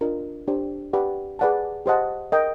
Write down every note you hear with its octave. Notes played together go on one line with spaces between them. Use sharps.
D4 F4 A#4 D#5
D4 G4 C5
G4 B4 D5 F#5 B5
G#4 B4 D5 F#5 A5
G4 C5 D#5 F#5 A5
A#4 D#5 G5